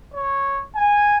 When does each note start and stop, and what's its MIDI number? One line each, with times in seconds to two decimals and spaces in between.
0.14 0.62 73
0.76 1.18 80